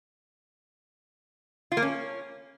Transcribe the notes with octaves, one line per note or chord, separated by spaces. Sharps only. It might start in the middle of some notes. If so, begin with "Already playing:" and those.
F4
A#3
C#4